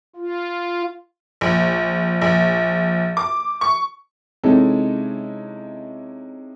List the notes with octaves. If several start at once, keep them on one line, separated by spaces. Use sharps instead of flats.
F4
A#1
A#1
D6
C#6
C3 G#3 C#4 D#4 E4 A4